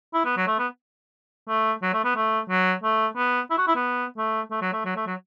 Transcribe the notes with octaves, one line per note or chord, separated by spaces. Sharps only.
E4
B3
F#3
A3
B3
A3
F#3
A3
B3
A3
F#3
A3
B3
E4
F#4
E4
B3
A3
A3
F#3
A3
F#3
A3
F#3